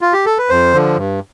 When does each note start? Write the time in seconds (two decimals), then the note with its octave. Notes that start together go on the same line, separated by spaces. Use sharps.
0.01 F4
0.13 G4
0.26 A4
0.38 B4
0.49 F2 C5
0.73 D3 F3
0.96 G2